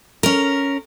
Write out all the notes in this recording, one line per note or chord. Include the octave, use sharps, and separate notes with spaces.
C#4 A#4